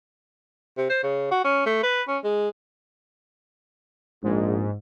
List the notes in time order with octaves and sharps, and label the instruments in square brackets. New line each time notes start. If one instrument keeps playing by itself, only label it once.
[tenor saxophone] C3
C5
C#3
F#4
C#4
A3
B4
C#4
G#3
[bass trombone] A#1 [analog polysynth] G#2